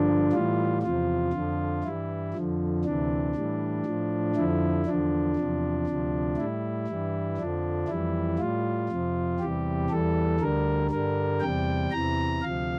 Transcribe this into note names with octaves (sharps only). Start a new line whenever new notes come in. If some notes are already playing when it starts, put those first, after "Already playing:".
Already playing: G2 D3 F3 D4
A2 E3 G3 F4
E2 C3 F3 F4
F2 D3 F3
G2 E3 G3 E4
F2 D3 F3
D2 C3 E3 D4
A2 E3 G3
A2 F3
F2 D3 F3 E4
E2 D3 F3 D4
E2 C3 F3
D2 C3 F3
A2 G3 E4
G2 E3 G3
F2 D3 F3 D4
F2 E3 G3 E4
A2 G3 F4
F2 C3 F3
E2 C3 E3 G3 G4
E2 E3 G3 A4
D2 D3 G3 A#4
G2 D3 G3 A#4
E2 C3 G3 G5
E2 C3 E3 A#5
D2 C3 F3 F5